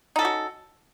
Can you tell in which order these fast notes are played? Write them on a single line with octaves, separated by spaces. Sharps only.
D#4 A4 C#4 F#4